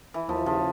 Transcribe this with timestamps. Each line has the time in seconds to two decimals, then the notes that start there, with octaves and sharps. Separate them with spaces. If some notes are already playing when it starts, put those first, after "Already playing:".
0.14 E3
0.28 D#2 F3
0.46 C#3 F3